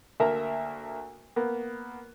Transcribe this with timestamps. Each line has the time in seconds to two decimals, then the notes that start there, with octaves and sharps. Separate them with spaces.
0.20 D2 A#3 A#4 E5 A5 A#5
1.36 A#3 B3